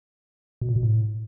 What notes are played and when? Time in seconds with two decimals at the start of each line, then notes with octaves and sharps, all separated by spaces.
0.61 B2
0.69 A#2
0.76 B2
0.83 A2